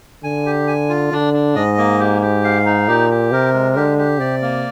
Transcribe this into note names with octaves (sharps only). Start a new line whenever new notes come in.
D3 G#5
G4
G#5
F4
D3 D4
D4
G#2 D#5
A#3
G4
G4
F5
D#4
A#2 G4
G4
C3 A#4
G#3
D3 G4
G4
C3 D5
A#3